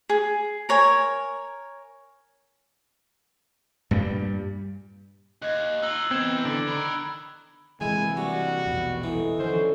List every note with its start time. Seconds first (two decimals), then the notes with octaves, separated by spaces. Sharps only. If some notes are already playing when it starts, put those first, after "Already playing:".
0.09 G#4
0.69 A#4 C#5 G#5
3.91 G2 A#2 G3
5.42 D#2 D#5 F#6 G#6
5.82 D#4 F4 E6 F#6 F#7
6.11 E3 B3 C4 D#4 G#6 E7
6.45 D3 D7
6.68 D#3 A#4 B5
7.81 C3 E3 G#3 B4 E5 G#5
8.17 G3 F#4
8.66 A#1 E2 B2
9.04 E3 D#4 A4
9.39 D3 D#3 F3 C#4 E4 C5